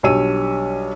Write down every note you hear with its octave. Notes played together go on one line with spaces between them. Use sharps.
B1 G3 D4 C#5 E6 D#7